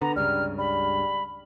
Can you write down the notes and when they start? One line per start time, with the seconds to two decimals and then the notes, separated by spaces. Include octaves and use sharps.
0.02 D3 B3 A#5
0.16 C#2 G2 C#3 G3 F6
0.59 G3 B5